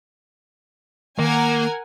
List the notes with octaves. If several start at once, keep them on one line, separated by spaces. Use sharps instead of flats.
D#3 A#3 A#4 F#5 G#5